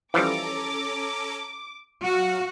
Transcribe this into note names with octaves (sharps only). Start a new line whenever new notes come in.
E3 F3 G3 C#4 A4 A#5 D6
F#3 F#4 F5